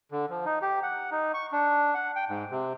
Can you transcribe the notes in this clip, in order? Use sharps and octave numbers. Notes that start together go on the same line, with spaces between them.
D3
F3
D#4
G4
F#5
D#4
C#6
D4
F#5
G5
G#2
C3